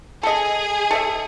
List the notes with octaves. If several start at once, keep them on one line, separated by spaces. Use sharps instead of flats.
G#4 A4 D#5
A4 D#5 E5